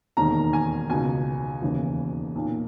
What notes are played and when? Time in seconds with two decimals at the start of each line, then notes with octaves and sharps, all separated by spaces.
0.17 E1 D#2 D#3 A#5
0.53 G#5
0.90 C#2 B2 G#5
1.62 E1 D#2 C#3 E3
2.35 B1 A#2